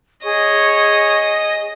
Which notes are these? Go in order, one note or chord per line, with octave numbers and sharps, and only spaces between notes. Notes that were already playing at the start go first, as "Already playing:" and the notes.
G#4 C#5 D#5